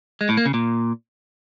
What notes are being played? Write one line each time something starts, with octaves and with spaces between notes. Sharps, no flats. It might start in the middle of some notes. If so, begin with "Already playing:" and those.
G#3
A2
A#3
C#3
A#2